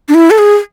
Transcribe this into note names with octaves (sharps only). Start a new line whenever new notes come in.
D4
E4
A4
G#4